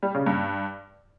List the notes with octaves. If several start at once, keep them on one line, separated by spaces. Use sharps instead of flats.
G3
C#3
G2